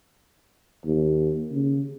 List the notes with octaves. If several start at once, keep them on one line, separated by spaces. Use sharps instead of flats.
D#2
C#3